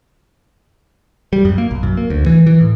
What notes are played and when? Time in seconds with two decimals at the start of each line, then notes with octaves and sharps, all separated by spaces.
1.33 G3
1.45 F#2
1.58 A#3
1.71 B1
1.83 F#2
1.97 A#3
2.10 D2
2.26 E3
2.47 E3
2.61 A2